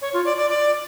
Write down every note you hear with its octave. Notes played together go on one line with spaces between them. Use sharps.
C#5
F4
D5
D5
D5